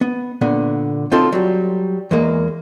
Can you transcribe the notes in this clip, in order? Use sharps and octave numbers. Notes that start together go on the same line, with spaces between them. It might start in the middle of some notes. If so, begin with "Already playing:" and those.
B3
A#2 D3 B3
B1 C4 D#4 F4 A4 A5
F#3 G3
E2 E3 G#3 A#3